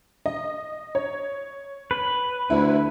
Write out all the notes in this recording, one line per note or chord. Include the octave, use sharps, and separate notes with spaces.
D#5
C#5
B4
D2 E4